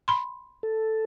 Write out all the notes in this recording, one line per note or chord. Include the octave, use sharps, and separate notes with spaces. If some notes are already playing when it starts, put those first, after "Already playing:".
B5 C6
A4